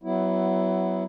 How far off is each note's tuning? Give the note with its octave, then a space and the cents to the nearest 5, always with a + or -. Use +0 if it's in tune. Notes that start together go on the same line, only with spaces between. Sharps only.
F#3 +25 B3 +15 E4 +0